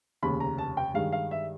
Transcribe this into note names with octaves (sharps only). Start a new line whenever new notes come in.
F1 D#2 C#3 B5
A#5
A5
G5
G2 D#3 G#3 F5
F5
E5